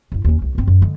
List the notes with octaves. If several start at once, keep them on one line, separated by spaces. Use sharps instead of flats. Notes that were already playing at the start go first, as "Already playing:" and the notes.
F#2 E4
D#2 C#4
C2
G2 C4
F#2
D3 G#3